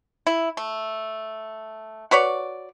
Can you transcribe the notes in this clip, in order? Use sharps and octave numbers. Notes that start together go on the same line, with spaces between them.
E4
A3
F#4 B4 C#5 D5